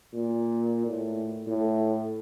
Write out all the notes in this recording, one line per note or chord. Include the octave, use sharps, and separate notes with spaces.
A#2
A2
A2